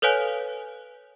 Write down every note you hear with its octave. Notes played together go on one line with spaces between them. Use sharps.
A4 B4 C#5 F5 G#5 F#6